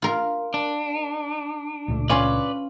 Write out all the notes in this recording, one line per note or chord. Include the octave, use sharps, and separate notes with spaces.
F4 A#4
D4
C#2 A#2 A3
C#4 F4 B4 D5